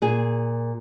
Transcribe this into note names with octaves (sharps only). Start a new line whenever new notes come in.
A#2 G#4